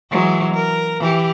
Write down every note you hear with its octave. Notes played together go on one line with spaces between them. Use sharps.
E3 F#3 G#3
A#4
E3 G4